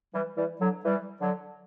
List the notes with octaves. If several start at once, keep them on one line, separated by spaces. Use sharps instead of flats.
E3 G3
E3 G3
D3 F#3
E3 G3
D3 F#3